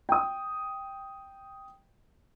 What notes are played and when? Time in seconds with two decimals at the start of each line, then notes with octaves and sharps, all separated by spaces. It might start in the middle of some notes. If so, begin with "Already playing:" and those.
0.09 G5 D#6